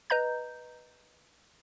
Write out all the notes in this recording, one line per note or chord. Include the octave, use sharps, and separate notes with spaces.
B4 D#5 A#5 G6